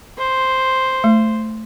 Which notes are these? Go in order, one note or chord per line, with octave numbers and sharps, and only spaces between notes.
C5
A3